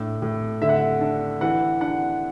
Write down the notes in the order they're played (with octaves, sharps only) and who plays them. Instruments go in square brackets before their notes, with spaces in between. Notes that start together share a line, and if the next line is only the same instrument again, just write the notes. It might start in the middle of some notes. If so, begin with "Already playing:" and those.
Already playing: [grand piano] A2 D4
A2
D3 E5
F#5
E5
D4
E3 F#5
D4 F#5